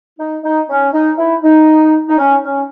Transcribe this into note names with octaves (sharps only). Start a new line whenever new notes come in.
D#4
D#4
C#4
D#4
E4
D#4
D#4
C#4
C#4